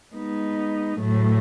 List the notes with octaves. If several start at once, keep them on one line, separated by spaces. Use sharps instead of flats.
G#3 B3 D#4
A2 F#3 A3